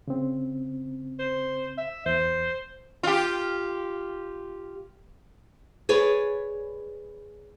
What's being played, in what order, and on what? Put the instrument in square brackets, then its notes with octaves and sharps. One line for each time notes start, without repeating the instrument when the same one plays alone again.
[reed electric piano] C#3 C4
[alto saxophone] C5
E5
[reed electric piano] E2 [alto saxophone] C5
[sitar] F4 G4
[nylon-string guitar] G#4 B4 C#5 D5